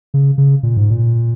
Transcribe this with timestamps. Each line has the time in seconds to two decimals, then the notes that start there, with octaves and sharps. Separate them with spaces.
0.14 C#3
0.38 C#3
0.63 A#2
0.77 G#2
0.90 A#2